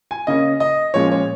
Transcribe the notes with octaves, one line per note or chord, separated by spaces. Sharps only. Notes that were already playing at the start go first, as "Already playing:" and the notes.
G#5
C#3 A#3 C#4 D#5
D#5
A#2 F3 G#3 C#4 C#5
C#5